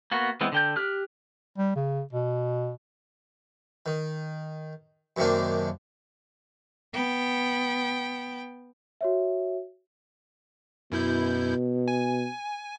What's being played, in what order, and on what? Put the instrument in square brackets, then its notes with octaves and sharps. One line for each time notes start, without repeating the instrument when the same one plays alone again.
[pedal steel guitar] A#3 B3 F#4
E3 G#3 B3 C4
D3 G5 G6
G4 F6 F#6
[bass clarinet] G3
C#3
B2
[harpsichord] D#3
F#2 C3 D#3 A#3 D4
[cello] B3 G5
[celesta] F#4 C#5 E5
[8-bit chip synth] F#2 E4 G6 [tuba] B2
[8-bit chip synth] G#5